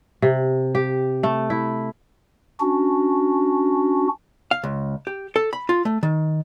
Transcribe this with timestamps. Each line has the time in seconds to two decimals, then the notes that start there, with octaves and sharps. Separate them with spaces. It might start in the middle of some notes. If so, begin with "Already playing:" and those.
0.22 C3
0.75 G4
1.23 A3
1.50 E4
2.60 C#4 D4 F#4
4.51 F5
4.64 C#2
5.07 G4
5.36 A4
5.53 B5
5.69 F4
5.85 A3
6.03 D#3